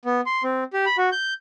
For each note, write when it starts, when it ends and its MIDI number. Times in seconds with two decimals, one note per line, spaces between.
0.05 0.21 59
0.26 0.43 84
0.44 0.64 60
0.73 0.85 67
0.86 0.97 83
0.98 1.10 66
1.12 1.34 91